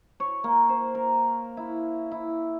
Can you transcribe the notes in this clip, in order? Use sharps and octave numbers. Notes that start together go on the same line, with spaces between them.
C#5
A#3
C5
A#4
E4
E4